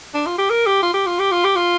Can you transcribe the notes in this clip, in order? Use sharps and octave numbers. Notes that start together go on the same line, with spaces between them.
D4
F4
G4
A#4
G4
F4
G4
F4
G4
F4
G4
F4